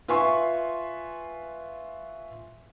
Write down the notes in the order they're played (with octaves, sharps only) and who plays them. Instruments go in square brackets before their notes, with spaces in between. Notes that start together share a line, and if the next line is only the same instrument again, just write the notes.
[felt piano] F4 B4 E5 G#5 C6 C#6